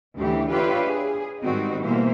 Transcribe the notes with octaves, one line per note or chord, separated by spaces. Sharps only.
D2 C#3 E3 F#3 G4
D4 F4 G4 B4 C#5 E5
G#4
G#2 D#3 G3 C4 F#4 D#5
B2 E3 A#3 C5 E5